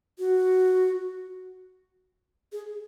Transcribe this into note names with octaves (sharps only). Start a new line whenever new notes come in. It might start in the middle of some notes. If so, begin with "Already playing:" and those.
F#4
G#4